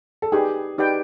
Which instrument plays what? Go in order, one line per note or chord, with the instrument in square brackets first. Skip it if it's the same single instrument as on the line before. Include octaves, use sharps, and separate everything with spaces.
[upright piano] A4
[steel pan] D#4 G4 B4 D5 G5 [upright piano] G#4
[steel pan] D#4 G4 B4 D5 G5